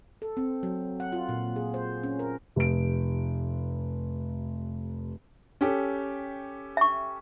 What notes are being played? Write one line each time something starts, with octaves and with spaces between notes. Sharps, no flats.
A4
C4
F#3
F#5
F4
A#2
G#4
C5
C#4
A#4
F1 D7
C#4 G4 A4
E5 C#6